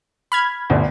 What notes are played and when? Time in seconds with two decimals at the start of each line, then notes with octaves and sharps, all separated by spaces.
0.32 B5 F6 G#6
0.70 G1 D2